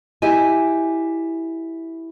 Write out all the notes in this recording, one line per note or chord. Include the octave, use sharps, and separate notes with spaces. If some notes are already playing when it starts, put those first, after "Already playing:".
E4 G4 D#5 G#5